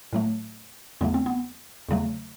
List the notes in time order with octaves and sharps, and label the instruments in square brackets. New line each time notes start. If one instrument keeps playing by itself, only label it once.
[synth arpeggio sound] A2 F#3 A3
E2 C#3 F#3 A3 B3
C4
B3
E2 C#3 F#3 A3